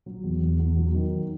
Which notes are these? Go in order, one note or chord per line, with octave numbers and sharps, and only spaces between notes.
F#3
E2
E2
E2
F#3
D#3